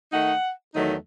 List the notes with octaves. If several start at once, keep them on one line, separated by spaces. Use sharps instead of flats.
D#3 A3 D#4 F#5
E2 D#3 F#3 A3 D#4